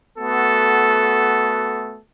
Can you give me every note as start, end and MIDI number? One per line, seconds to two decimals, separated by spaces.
0.18 2.01 57
0.18 2.01 59
0.18 2.01 66
0.18 2.01 69